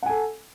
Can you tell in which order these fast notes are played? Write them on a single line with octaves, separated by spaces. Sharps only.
F#5 G#5 A4